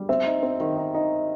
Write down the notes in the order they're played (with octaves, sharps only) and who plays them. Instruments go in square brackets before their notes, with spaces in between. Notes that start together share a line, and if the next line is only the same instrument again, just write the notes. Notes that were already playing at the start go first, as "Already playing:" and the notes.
Already playing: [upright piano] G3
[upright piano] C4 [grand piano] E5
[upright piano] D#4
C4
D#3
D#4
D#4